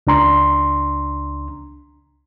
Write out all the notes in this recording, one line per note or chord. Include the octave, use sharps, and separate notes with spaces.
C#2 D4 A#5 C6